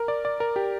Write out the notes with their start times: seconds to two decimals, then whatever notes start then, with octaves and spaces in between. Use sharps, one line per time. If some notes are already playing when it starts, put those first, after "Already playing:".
Already playing: A#4
0.08 D5
0.25 D5
0.40 A#4
0.56 G4